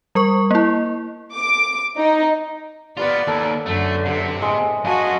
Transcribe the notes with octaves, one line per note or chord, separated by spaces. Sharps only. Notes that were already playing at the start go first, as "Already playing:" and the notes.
G3 A#4 C#6
A#3 E4
D6
D#4
B3 F4 G4 B4 D5 F#5
D#2 A4
F#2 D3 A3
C3
A2 G#3
F#2 F#4 D#5 F5 G#5 A5 C6